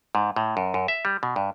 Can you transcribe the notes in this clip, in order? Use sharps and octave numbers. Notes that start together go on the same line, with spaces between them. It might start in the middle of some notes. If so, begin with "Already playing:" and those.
G#2
A2
F#2
F#2
E5
G3
B2
G2